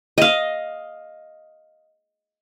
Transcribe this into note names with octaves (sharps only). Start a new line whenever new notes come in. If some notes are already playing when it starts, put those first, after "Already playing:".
D#5 F5